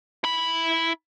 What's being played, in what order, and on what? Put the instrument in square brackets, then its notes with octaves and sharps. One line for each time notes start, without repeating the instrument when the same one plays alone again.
[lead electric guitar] E4 B5